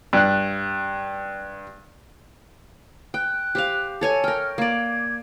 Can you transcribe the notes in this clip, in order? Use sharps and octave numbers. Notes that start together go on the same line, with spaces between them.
G2 F#6
G5 F#6
G4 C5 F5
A4 C#5 G#5
A#4 G5 F6
A#3 D5 G#6